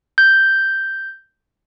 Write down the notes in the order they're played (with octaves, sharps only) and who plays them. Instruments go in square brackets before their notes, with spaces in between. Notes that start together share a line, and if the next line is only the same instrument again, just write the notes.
[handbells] G6